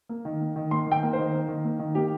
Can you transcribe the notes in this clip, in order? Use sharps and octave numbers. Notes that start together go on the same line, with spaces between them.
A#3
D#3
A#3
D#3
A#3 C6
D#3
G5
A#3
C5
D#3
A#3
D#3
A#3
D#3
A#3 G4